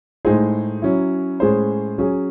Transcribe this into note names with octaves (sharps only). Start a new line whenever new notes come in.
A2 G#3 D#4 G#4 C5
F#3 C#4 E4
A2 G#3 C#4 G#4 C5
F#3 C#4 G#4